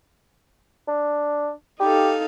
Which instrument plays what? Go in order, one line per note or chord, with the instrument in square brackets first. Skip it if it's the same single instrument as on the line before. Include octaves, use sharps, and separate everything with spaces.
[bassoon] D4
[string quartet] D#4 A4 F5 [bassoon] G4